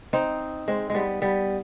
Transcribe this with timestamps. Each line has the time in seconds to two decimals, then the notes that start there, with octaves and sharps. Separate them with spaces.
0.13 C4 D#4
0.68 G#3 C4
0.90 G3 G#3 B3
1.22 G3 B3